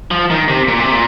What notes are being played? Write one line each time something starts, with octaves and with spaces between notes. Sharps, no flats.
F3
D#3
C3
A#2
C3
A#2